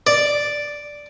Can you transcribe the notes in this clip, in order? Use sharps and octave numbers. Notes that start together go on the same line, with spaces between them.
D5